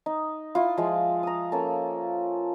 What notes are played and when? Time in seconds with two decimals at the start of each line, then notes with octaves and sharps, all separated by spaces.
0.06 D#4
0.55 E4 F4
0.78 F3 G#3
1.23 A#5 D#6
1.52 A#3 C#4 A4